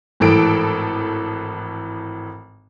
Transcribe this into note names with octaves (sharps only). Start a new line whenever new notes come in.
G#1 A2 E3 A4 D7